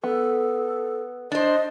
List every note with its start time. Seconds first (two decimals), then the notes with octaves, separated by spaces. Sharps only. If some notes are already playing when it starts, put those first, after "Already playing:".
0.04 B3 A4
1.32 D4 C5 D#5